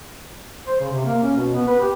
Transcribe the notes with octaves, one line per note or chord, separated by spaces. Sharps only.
C5
C#3
C3
A#3
C#4
B2
B3
B4
G4